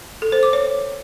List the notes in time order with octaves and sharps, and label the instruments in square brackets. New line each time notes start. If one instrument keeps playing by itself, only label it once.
[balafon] A4
C5
D6
C#5